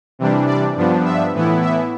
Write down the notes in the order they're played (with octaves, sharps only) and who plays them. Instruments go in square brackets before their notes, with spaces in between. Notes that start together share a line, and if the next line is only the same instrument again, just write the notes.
[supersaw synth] C3 E3 G3 D4
D5
G2 F3 B3 D4
E5
A2 E3 B3 E4
E5